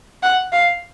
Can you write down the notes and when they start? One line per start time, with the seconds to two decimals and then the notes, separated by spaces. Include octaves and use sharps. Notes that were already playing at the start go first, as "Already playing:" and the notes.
0.23 F#5
0.53 F5